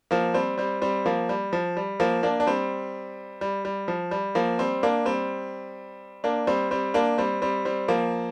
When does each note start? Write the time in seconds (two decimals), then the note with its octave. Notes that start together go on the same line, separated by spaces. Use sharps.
0.11 F3 A#3
0.34 G3 C4
0.58 G3 C4
0.82 G3 C4
1.06 F3 A#3
1.29 G3
1.53 F3
1.77 G3
2.00 F3 A#3
2.23 A#3 D4
2.40 D4
2.47 G3 C4
3.41 G3
3.65 G3
3.88 F3
4.11 G3
4.35 F3 A#3
4.59 G3 C4
4.83 A#3 D4
5.06 G3 C4
6.24 A#3 D4
6.47 G3 C4
6.71 G3 C4
6.94 A#3 D4
7.18 G3 C4
7.42 G3 C4
7.65 G3 C4
7.88 F3 A#3